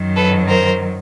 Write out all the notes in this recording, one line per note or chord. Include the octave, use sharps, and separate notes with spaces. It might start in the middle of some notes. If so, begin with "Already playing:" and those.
Already playing: F#2 D#3 F#3
A4 B4
A#4 C5